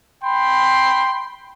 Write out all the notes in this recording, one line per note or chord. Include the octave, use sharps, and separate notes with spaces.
G5 B5 C6